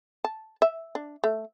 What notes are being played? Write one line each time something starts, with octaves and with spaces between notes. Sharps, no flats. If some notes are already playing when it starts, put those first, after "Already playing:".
A5
E5
D4
A3